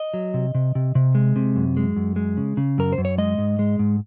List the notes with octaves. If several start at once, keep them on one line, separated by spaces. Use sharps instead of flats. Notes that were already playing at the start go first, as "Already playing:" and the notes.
Already playing: D#5
F#3
C3
C3
C3
C3
G#3
C3
F#2
G#3
F#2
G#3
C#3
C#3
F#2 A#4
C5
F#2
C#5
G#3 D#5
G#2
G#3
G#2